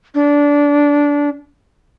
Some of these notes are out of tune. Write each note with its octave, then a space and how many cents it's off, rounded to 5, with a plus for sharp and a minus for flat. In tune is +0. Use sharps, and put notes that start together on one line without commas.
D4 -20